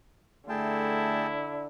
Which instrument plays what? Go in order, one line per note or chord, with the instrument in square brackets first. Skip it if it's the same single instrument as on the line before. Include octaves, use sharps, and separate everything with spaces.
[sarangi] D3 [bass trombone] A3 [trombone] E4 [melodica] G#4 G5 A5